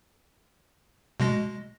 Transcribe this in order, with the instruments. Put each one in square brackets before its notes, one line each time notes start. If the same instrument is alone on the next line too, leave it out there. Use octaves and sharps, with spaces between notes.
[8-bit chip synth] B2 G#3 A#6